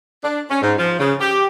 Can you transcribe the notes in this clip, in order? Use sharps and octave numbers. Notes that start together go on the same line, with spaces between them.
D4
C#4
G#2
F3
C#3
G4